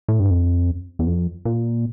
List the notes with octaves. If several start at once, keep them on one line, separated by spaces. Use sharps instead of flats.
A2
G2
F2
E2
F2
A#2